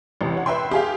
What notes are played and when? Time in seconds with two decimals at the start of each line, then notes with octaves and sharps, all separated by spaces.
0.21 A1 C3
0.35 C#5 F#5
0.46 B4 E5 G5 C6
0.71 G4 G#4 F5